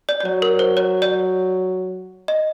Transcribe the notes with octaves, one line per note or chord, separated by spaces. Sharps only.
D5
D5
F#3 C#5
A#4
C5
C#5
D5
D#5